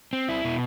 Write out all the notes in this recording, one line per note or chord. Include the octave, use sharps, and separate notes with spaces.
C4
E4
B2